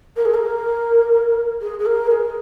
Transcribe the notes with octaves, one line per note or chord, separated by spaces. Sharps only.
A#4
G#4
A#4
G#4
G#4
A#4
G#4